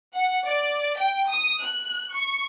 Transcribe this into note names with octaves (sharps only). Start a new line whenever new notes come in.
F#5
D5
G5
D#6
F#6
C#6